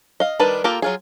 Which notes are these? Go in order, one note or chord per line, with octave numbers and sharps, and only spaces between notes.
D#5 F5
D#3 G3 D4 B4 A5
A#3 F4 G4 A4 A#5
F#3 F4 G#4